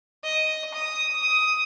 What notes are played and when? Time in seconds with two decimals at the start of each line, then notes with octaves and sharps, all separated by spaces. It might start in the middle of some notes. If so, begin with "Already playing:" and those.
0.24 D#5
0.74 D#6
1.22 D#6